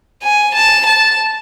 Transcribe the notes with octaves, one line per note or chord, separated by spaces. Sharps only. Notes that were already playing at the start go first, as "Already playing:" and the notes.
G#5
A5
A5